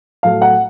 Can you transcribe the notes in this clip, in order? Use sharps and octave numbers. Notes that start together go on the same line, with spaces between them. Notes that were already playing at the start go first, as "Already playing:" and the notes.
A2 F#3 A3 F5
F#5